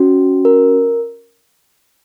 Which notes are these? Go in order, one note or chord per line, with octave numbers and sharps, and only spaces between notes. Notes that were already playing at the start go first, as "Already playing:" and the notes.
Already playing: C#4 F#4
A#4